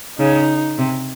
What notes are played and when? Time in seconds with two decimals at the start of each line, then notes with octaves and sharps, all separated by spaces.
0.19 C#3 D#4
0.78 C3